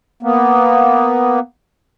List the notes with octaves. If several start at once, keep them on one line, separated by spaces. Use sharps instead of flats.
A#3 B3